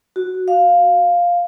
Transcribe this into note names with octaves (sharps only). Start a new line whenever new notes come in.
F#4
F5